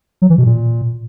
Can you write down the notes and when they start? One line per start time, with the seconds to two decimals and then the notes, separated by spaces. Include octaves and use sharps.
0.22 F#3
0.30 E3
0.38 B2
0.46 A#2